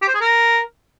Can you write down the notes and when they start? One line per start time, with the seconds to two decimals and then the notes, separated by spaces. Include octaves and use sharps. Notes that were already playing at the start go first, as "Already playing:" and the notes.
0.02 G4
0.08 C5
0.14 G#4
0.21 A#4